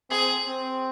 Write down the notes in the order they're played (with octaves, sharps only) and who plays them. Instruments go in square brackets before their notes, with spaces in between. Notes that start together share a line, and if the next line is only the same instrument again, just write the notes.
[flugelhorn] C4 [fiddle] G#4
[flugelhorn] C4